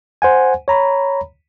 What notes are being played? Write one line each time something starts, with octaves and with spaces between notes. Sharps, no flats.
C5 F#5 G#5
C#5 A#5 B5